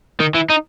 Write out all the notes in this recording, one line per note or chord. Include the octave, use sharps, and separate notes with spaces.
D#3
E3
D#4